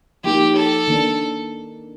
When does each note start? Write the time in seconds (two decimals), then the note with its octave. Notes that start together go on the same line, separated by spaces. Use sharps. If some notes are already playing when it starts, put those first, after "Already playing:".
0.24 F3 A#3 D#4 G4
0.56 A4
0.88 D#3 A#3 D4